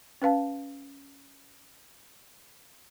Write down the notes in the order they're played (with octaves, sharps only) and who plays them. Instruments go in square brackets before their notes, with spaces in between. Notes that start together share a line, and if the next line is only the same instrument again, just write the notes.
[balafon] C#4 B4 F5 A5